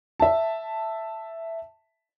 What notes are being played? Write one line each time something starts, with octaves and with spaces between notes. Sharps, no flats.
E5 A5